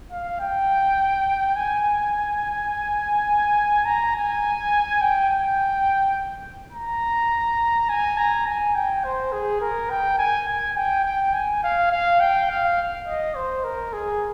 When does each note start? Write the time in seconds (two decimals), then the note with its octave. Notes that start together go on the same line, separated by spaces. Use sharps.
0.12 F5
0.40 G5
1.56 G#5
3.85 A#5
4.15 G#5
5.01 G5
5.29 G5
6.73 A#5
7.89 G#5
8.18 A#5
8.46 G#5
8.75 G5
9.04 C5
9.32 G#4
9.61 A#4
9.90 G5
10.18 G#5
10.48 G#5
10.76 G5
11.05 G5
11.33 G#5
11.63 F5
11.91 F5
12.20 G5
12.50 F5
13.07 D#5
13.35 C5
13.64 A#4
13.93 G#4